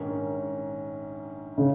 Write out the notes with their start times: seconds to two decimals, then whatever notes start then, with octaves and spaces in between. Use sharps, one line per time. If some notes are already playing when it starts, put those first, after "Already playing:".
Already playing: A#1 G#2 D#3 C#4 A#4
1.58 C#3